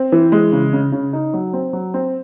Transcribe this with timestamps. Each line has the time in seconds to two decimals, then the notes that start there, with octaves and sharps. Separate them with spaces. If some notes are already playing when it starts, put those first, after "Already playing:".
Already playing: C4
0.12 E3
0.32 G#3
0.52 C#3
0.73 C#3
0.92 C#3
1.13 D#4
1.34 F#3
1.53 C4
1.73 F#3
1.94 C4